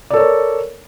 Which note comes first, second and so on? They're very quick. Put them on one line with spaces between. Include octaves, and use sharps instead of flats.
D5 A4 C#5 A#4